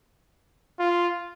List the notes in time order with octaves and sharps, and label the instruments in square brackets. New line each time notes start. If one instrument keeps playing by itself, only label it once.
[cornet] F4